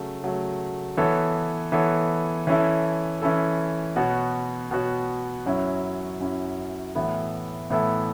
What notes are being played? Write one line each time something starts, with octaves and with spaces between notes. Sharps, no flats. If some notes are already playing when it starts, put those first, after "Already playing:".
Already playing: C#3 F#3 A3
C#3 F#3 A3
E3 B3 A4 C#5
E3 B3 A4 C#5
E3 C#4 E4 A4
E3 C#4 E4 A4
B2 B3 F#4 C#5
B2 B3 F#4 C#5
F#2 F#3 C#4 E4
F#2 F#3 C#4 E4
A2 E3 B3 E4 A4
A2 E3 B3 E4 A4